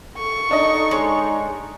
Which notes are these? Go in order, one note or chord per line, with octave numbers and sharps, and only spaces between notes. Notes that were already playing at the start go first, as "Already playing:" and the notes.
A4 C#6
D4 D#4 D#5
G#3 C#5